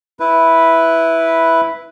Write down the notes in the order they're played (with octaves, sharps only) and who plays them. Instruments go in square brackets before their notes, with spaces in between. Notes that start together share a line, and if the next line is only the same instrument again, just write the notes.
[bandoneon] E4 B4